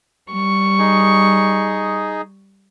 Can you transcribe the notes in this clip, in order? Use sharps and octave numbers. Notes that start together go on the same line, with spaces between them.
G3 C#6
D#4 G#4